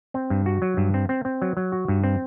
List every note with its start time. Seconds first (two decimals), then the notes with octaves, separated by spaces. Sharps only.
0.14 C4
0.30 G2
0.46 F#4
0.62 F#3
0.77 G2
0.94 C4
1.09 C4
1.25 C4
1.42 F#3
1.57 F#3
1.72 F#4
1.88 G2
2.04 C4